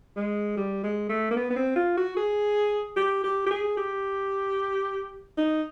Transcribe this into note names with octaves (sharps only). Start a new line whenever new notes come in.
G#3
G3
G#3
A3
A#3
B3
B3
C4
F4
F#4
G#4
G4
G4
G4
G#4
G4
D#4